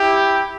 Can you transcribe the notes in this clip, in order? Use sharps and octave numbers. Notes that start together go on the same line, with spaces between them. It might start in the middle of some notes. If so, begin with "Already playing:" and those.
Already playing: E4 G4